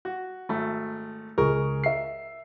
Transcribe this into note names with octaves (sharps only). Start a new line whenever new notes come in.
F#4
G#1 A3
C#2 G#4 A#4 C#6
E5 C7